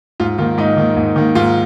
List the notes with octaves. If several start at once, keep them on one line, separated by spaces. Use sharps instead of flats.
G#2 F4
D#3 A#3 F4
G#2 D#4
D#3 A#3
G#2
D#3 A#3
G#2 F4